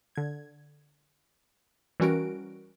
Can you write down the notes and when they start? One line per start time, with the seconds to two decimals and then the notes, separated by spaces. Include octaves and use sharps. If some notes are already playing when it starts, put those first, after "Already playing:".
0.15 D3 G#6
2.00 E3 G3 C#4 F#4 A#4 D7